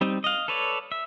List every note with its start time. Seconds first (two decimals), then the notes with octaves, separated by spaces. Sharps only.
0.01 G3 C4 D#4
0.24 D#5 F5
0.48 A4 B4 C#5 D5
0.92 E5